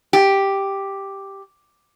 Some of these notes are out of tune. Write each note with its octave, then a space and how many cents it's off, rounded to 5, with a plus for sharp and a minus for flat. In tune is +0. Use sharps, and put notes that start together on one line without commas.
G4 +0